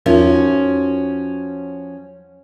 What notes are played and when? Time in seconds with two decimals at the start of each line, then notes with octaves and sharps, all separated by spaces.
0.06 E2 F3 C#4 F4 F#4 A#4